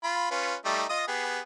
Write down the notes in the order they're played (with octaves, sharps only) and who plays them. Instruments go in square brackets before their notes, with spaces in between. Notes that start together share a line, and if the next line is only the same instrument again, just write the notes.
[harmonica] F4 B5
C#4 F4 B4
G3 A3 D#4
F4 D#5 D#6
B3 G4 G#4